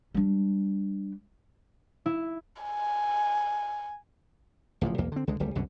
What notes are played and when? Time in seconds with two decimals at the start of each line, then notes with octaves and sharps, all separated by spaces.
0.14 G3 D4
2.06 E4
2.63 G#5
4.81 D1 A1 A#2 F3
4.98 B1 E2 A#3
5.12 D3 C4
5.27 C#2 D3 G#3
5.40 D1 C#2 G3
5.55 C2 F#2 B2 D3